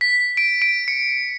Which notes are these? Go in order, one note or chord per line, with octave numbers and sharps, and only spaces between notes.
B6
D7
D7
C#7